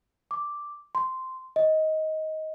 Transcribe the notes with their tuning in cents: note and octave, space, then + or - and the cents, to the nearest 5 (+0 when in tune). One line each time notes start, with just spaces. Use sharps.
D6 +0
C6 -10
D#5 +15